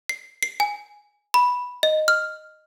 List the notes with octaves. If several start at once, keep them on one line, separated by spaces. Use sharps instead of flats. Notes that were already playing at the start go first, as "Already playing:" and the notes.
C7
C7
G#5
B5
D#5
F6